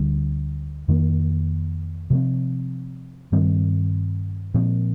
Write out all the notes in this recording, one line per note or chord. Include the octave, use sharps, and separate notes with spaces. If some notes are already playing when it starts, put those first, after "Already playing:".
Already playing: D2 D3 G3
F2 D#3 A#3
C3 F3 C4
G2 D#3 G3 C4
A#2 F3 C4